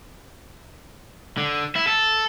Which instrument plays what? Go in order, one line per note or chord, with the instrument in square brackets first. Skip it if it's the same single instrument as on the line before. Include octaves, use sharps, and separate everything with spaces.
[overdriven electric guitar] D3
E4
A4